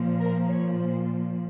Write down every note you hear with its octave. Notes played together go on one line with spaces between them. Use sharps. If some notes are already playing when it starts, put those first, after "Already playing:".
Already playing: A#2 F3
A#4
C#5
C5